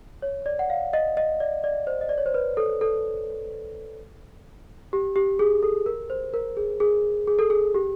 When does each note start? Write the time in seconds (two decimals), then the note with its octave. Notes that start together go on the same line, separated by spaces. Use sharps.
0.22 C#5
0.46 D5
0.59 F#5
0.70 F5
0.93 D#5
1.17 D#5
1.40 D5
1.64 D5
1.87 C5
2.01 D#5
2.09 D5
2.18 C#5
2.26 C5
2.34 B4
2.57 A4
2.81 A4
4.93 G4
5.16 G4
5.39 G#4
5.63 A4
5.86 A#4
6.10 C5
6.34 A#4
6.57 G#4
6.80 G#4
7.28 G#4
7.39 A4
7.50 G#4
7.75 G4